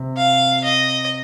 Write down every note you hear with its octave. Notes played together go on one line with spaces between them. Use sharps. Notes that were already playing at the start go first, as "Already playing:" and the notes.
Already playing: C3
F5
D#5